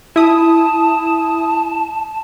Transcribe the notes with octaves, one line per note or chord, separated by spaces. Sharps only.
E4 A5 D#6